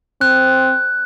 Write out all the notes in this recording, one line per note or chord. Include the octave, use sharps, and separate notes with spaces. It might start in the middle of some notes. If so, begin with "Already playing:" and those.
C4 F#6